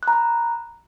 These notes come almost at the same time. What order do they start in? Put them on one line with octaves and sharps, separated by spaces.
F#6 A#5 B5